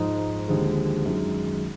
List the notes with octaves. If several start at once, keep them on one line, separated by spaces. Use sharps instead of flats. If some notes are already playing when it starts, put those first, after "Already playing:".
Already playing: G#2 F3 G#3 D#4
D#2 D3 F3 G#3
F#2 D#3 G#3